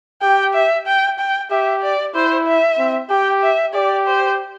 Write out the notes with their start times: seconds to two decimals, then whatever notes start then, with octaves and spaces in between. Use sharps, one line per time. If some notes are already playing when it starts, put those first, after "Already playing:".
0.22 G4 G5
0.54 E5
0.87 G5
1.19 G5
1.51 G4 E5
1.82 D5
2.15 E4 C5
2.47 E5
2.79 C4
3.10 G4 G5
3.43 E5
3.74 G4 D5
4.07 C5